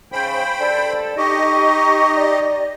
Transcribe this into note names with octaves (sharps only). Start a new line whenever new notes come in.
G#2 C#3 C5 G5 B5
G2 D4 A4 D5
D#4 G4 D#5 C#6
D5